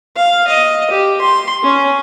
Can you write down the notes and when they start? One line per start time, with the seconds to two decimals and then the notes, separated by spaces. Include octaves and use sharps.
0.16 F5
0.47 D#5
0.90 G4
1.21 C6
1.63 C#4